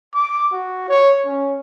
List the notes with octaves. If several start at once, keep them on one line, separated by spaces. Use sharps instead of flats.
D6
F#4
C#5
C#4